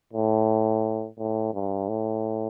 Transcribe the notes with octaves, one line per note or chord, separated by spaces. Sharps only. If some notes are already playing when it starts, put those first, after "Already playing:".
A2
A2
G2
A2